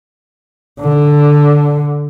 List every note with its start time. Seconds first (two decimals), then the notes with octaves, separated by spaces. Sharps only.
0.80 D3